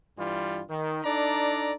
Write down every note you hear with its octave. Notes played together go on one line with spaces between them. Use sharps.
G2 E3 G3 F4
D#3
D4 D#4 A4 D5 A#5